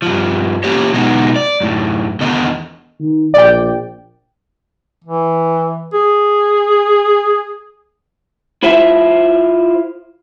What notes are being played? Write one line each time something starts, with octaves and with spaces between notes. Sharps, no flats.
G2 F3
E3 A#3 C#4 G4 C#5
B2 F#3 G#3 B3 D#4 F#4
D5
F#2 A2
E2 D3 D#3 B3 D#5
D#3
A#1 D5 G5
E3
G#4
E4 F4 C5 E5